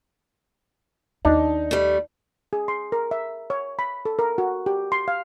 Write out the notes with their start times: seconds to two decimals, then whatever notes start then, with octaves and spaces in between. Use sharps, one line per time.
1.25 D#2 D4 D#4
1.71 G3 A3
2.53 G#4
2.68 C6
2.92 A#4
3.11 E5
3.50 C#5
3.79 B5
4.05 A4
4.19 A#4
4.38 F#4
4.66 G4
4.92 C6
5.08 F5